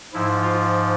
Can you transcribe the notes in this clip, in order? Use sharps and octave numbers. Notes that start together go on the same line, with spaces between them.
G#2 F3 E4
F4